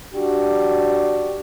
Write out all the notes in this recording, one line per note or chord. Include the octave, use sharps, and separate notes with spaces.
D4 F#4 G4